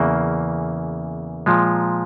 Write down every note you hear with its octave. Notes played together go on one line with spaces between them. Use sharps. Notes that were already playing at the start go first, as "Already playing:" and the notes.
Already playing: E2 C#3 E3 A#3
A#2 F3 G#3